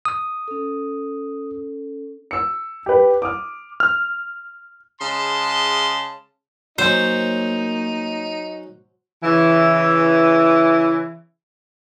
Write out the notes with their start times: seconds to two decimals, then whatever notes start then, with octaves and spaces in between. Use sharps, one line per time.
0.05 D#6
0.48 C#4 A4
2.31 E6 C#7
2.86 G4 B4
3.22 D6 D#6 F6
3.80 F6
5.01 C#3 G#3 A5 C6
6.78 F#3 A#3 C#4 D#4 C5
9.23 C#3 E3